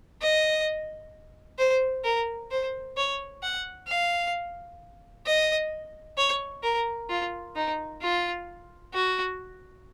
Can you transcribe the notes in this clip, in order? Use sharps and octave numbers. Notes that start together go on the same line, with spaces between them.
D#5
C5
A#4
C5
C#5
F#5
F5
D#5
C#5
A#4
F4
D#4
F4
F#4